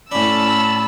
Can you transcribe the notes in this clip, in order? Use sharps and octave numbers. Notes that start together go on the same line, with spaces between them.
A2 C#4 D4 A5 B5 E6